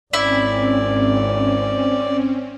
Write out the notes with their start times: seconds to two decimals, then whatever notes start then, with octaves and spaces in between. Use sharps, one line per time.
0.13 G#1 C4 C#4 E4 D5